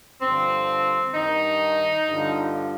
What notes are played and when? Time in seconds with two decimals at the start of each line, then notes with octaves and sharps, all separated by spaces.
0.22 G2 D3 F3 C4
1.14 G2 D#3 D#4
2.07 G2 D3 F3